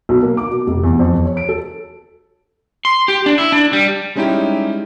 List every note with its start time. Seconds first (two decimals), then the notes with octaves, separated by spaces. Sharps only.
0.09 B1
0.23 A#3
0.37 D6
0.51 B2
0.67 F1
0.84 E2
0.99 F2
1.14 E2
1.26 C#5
1.37 D7
1.49 A4
2.85 C6
3.08 G4
3.26 D4
3.38 E4
3.52 D4
3.73 G3
4.16 G3 G#3 C#4 D#4 E4 G4